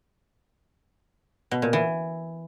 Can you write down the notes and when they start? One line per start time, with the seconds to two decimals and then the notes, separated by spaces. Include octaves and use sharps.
1.51 B2
1.62 A#2
1.73 E3